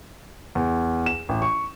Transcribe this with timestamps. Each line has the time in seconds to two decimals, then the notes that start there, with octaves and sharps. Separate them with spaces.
0.55 E2
1.06 E7
1.29 A1
1.42 C#6